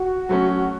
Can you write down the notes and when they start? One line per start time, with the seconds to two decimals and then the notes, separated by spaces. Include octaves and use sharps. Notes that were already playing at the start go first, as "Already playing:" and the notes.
Already playing: F#4
0.29 F#3 A3 C#4